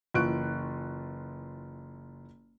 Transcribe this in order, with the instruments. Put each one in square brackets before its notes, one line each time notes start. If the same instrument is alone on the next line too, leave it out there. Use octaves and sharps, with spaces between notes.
[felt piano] F#1 E3 F4 C#6 F#6 D7